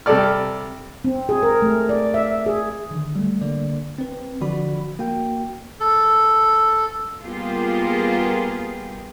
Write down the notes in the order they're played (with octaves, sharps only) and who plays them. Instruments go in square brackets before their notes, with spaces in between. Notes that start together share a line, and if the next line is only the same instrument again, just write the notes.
[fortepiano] C3 G3 A4 D5 F6
[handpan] C4
G#4
A#4
A3
D5
E5
G#4
[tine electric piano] D3 D#3
G3 A3
D3 A#3 D5
C4 B4
D3 F3 F#4 D5 B5
A#3 F#4 G5
[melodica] A4
[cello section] G3 A#3 B3 F4 G4 G#4